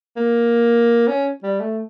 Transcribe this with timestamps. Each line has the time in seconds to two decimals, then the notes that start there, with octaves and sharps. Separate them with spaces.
0.17 A#3
1.08 C#4
1.43 G3
1.60 A3